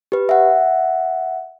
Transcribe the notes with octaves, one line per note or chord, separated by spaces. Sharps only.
G4 B4
E5 F#5